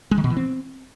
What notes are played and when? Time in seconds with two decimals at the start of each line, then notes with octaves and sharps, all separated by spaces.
0.11 G#3
0.18 D#3
0.24 B2
0.30 E3
0.37 C4